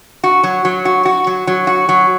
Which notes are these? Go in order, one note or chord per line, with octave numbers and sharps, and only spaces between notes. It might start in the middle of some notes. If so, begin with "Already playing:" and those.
F#4
F#3
F#3
F#4
F#4
F#3
F#3
F#4
F#3